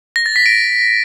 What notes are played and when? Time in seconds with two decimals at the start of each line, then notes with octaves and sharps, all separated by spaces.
0.16 A#6
0.26 A6
0.36 B6
0.46 D7